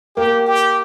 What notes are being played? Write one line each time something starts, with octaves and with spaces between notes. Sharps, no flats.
A#3 G4
G4